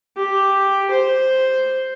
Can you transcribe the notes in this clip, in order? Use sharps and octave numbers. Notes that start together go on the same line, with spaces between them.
G4
C5